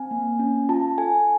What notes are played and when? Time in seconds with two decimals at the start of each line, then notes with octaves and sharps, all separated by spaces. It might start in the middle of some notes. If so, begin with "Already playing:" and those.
Already playing: C4 G#5
0.11 A#3
0.39 C#4
0.69 F4 A5
0.98 A4 G#5